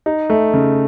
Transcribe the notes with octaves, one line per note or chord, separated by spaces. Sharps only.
D#4
A3
C#3